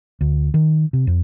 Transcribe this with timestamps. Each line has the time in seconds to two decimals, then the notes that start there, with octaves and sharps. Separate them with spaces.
0.21 D2
0.54 D#3
0.93 C3
1.07 F2